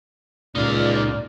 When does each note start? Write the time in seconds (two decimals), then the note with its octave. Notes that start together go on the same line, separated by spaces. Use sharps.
0.55 C#2 A#2 D#4 D5 F5